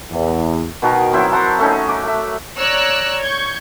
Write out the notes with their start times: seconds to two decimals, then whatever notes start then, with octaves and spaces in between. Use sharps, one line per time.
0.12 E2
0.82 B2 D#3 F#4 A#4
1.13 F#3 C4 E4
1.32 A#4 C5 F#5 A5
1.59 A3 C#4 D#4
1.89 D6
2.03 A3 E5
2.58 C#5 D5 A#5 E6 F#6
3.22 C#6 G6 G#6